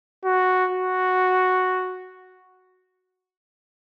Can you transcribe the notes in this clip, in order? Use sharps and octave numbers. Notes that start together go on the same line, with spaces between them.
F#4
F#4